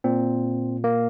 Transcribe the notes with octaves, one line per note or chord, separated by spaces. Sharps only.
A#2 C4
A#3